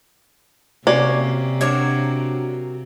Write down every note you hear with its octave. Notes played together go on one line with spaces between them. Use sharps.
C3 A#3 C#4 F#4 C#5 D5
F#3 D4 F#4 A#4 C#5